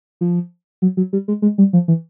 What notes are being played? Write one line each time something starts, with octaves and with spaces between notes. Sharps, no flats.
F3
F#3
F#3
G3
G#3
G#3
G3
F3
E3